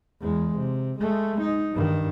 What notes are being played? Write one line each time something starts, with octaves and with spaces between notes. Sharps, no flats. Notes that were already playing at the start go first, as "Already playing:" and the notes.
E2 G#3
C3
G#3 A3
D#4
G2 D#3